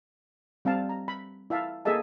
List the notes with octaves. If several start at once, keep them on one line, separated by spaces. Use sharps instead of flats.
G3 C4 F5 A5
A#5
B5
E4 E5 F5 A5
A#3 G#4 A4 D#5 E5 A5